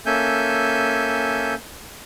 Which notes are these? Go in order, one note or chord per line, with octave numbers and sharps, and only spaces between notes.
A#3 C#4 A4 E5 G#5 G6